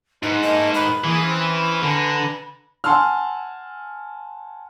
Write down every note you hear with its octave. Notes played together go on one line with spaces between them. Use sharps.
G#2 D#4 B4
A3 A#3 D#5
D#3 B4 B5
E3 A#3 G#4
C4 C#4
D3 B4 G#5 A#5
F#5 G#5 A5 C6 E6 F6